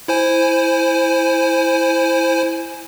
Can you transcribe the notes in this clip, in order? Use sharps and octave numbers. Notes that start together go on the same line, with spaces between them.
E4 C5 G#5